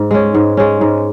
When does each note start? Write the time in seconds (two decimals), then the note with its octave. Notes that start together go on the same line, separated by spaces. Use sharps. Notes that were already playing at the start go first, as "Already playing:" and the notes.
Already playing: G#2
0.11 G#3 C#4
0.35 G#2
0.57 G#3 C#4
0.81 G#2